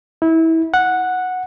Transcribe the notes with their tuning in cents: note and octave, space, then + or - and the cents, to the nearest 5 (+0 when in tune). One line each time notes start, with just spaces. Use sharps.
E4 -25
F#5 -5